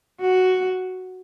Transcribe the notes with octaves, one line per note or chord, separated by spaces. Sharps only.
F#4